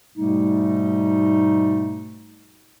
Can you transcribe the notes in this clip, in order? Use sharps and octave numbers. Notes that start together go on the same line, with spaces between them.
G#2 B2 G3 A3 D#4